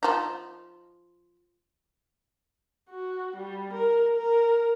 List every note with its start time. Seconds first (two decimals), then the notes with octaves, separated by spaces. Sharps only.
0.03 F3 D#4
2.90 F#4
3.37 G3
3.73 A#4
4.17 A#4